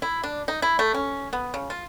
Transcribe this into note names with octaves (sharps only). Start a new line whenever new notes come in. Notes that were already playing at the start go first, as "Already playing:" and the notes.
E4
D4
D#4
E4
A3
C#4
B3
C#3
F4